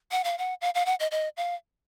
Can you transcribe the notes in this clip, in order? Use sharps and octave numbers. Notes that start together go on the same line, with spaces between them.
F#5
F5
F#5
F5
F5
F#5
D#5
D#5
F5